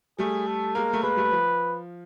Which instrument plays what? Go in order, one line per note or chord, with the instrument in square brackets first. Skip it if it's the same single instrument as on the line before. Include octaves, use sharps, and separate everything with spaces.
[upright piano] G3 A3 [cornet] G#4
[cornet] A4
[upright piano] G#3 A#3 [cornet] A#4
[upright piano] A3
[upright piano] G#3 A#3 [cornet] B4
[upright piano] G3 A3
F3